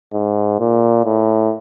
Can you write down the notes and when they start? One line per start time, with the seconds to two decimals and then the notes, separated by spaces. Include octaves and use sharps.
0.14 G#2
0.60 A#2
1.05 A2